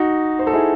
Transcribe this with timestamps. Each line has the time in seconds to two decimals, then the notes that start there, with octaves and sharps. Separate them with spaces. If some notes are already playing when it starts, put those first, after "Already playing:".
Already playing: D#4 F#4
0.39 C5
0.47 A4
0.53 E4 G#4